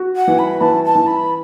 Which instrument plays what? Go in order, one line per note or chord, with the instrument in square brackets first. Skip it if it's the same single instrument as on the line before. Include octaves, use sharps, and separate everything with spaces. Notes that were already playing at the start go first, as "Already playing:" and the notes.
Already playing: [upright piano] F#4
[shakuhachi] F#5
[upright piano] E3
[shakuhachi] B5
[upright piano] E3 [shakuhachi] A5
[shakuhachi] A5
[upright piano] E3
[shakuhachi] B5